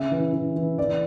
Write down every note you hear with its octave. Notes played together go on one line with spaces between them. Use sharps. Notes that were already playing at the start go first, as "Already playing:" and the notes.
Already playing: C#3 E5
E3
E3
E3
E3 D5